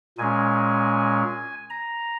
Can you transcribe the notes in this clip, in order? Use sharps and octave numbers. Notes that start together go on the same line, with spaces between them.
A#2 G#3 C#4 G#5
A#5